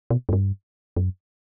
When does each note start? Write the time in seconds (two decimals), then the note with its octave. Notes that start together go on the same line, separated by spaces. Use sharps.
0.10 B2
0.29 F#2
0.33 G2
0.97 F#2